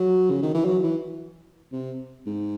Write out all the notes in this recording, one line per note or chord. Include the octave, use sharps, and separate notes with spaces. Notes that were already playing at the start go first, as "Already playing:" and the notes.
Already playing: F#3
C#3
D#3
E3
F#3
E3
C3
G#2